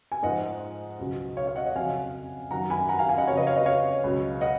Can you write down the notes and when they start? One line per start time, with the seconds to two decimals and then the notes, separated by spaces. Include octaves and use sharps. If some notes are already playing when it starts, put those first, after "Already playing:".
0.12 G#5
0.23 G#2 F3 D#5 F#5
0.99 C#2 B2 F#3
1.37 C#5 F5
1.47 C#5 F5
1.56 D#5 F#5
1.66 D#5 F#5
1.75 F2 C#3 F#3 F5 G#5
2.51 F#2 D#3 F#3 F#5 A#5
2.70 G#5 B5
2.89 F#5 A#5
2.99 F5 G#5
3.09 F5 G#5
3.17 D#5 F#5
3.27 F2 C#3 F#3 C#5 F5
3.37 B4 D#5
3.47 C#5 F5
3.56 B4 D#5
3.66 C#5 F5
4.04 C#2 B2 F#3
4.41 D#5 F#5